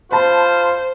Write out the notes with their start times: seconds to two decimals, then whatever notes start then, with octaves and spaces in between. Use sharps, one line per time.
0.12 F4 C5 A5 B5